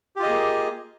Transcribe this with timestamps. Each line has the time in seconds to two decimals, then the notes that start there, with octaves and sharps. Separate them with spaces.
0.16 G4
0.19 F4
0.23 D#5
0.26 G#4
0.29 A#3